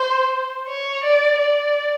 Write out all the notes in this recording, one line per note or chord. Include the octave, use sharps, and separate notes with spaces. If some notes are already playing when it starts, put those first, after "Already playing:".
Already playing: C5
C#5
D5
D5